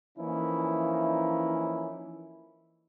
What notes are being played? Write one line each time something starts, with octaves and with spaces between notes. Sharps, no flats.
E3 F3 A#3 C#4 D#4 E4